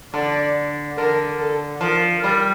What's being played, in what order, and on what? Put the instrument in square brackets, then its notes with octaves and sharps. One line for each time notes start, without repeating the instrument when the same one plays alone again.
[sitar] D3 [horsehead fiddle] D5
[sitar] D3 [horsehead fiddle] A#4
[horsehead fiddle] A4
[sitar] F3 [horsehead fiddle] A#4
[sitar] G3 [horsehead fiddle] A#4